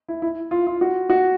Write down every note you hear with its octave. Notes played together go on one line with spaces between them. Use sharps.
E4
E4
F4
F4
F#4
F#4